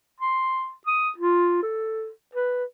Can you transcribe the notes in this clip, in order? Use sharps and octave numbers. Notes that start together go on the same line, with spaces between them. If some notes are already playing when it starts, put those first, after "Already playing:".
C6
D#6
F4
A4
B4